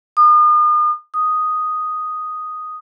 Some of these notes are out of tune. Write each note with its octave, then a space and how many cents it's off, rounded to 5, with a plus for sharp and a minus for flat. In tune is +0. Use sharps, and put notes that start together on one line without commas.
D#6 -40
D#6 +0